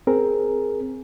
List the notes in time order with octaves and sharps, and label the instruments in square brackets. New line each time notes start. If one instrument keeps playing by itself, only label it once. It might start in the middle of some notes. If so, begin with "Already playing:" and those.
[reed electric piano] C4 G#4 A#4